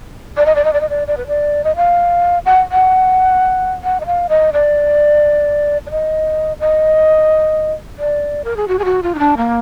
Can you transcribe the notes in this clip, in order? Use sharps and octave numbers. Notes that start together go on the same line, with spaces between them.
D5
D#5
D5
D#5
D5
D#5
D5
D5
B4
D5
D#5
F5
F#5
F#5
F#5
D#5
F5
D#5
D5
D5
D#5
D#5
D5
A#4
G#4
F#4
G#4
F#4
F4
D#4
D4
A#3